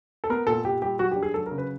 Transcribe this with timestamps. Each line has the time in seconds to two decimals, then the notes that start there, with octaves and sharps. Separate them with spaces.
0.24 A4
0.30 B3 A#4
0.47 A#2 A4
0.64 A#2 G4
0.82 G3 G4
0.99 F#3 F#4
1.11 G4
1.16 D4
1.23 G#4
1.34 F#3 A4
1.46 A#4
1.51 C#3
1.58 B4